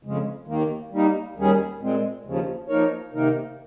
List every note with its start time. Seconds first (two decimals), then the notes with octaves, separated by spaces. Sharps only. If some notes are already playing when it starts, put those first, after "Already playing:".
0.03 F2 C#3 G#3
0.47 D#2 D#3 A#3
0.91 G3 A#3 D#4
1.36 D#2 D#3 G3 C#4 G#4
1.80 A#2 G#3 C4
2.25 D#2 C#3 F3
2.68 F3 A#3 D#4 A#4 C#5
3.13 C3 D#3 A#3 D#4 A#4